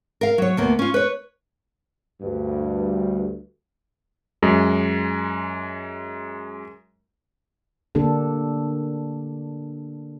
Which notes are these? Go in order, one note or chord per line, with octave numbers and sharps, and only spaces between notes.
A#4 F5
F#3 C#5
D2 A#3 B3
C#4 F4
B4 C#5
D2 G2
F#2 G#3
D3 A#3 D4 G4 A4